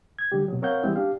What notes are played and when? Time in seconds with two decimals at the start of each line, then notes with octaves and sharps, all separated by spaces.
0.19 G#6
0.32 D3 F#3 G3 G4
0.48 B2 F#3
0.62 C4 A#4 C#5 F5 F#5 G6
0.83 E3 G3 G#3 B3 C4 E4
0.96 D4 G4 F5